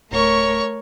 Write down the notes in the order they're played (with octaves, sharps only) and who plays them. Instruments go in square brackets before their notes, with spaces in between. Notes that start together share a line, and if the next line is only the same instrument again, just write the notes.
[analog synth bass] D1 [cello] A3 A#4 [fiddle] C#5 C#6